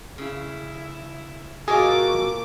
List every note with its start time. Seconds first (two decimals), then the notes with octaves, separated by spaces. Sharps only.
0.18 C#3 E4
1.68 A#2 F4 F#4 G#4 A4 D#5 D6